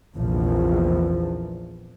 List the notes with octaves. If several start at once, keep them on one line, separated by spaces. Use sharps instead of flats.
A#1 E2 C3 F3